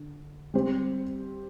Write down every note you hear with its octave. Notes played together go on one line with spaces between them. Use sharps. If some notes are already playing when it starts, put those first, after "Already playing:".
Already playing: D3
G3 C4 G4 C5